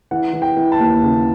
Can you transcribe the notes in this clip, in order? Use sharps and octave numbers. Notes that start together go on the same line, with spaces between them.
E3 F#5
E3
G5
E3
A5
D#2
C#3